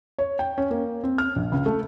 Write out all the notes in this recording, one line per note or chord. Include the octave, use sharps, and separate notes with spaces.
C#5
G5
C#4
A#3
C4
F6
A#1
C#2
A3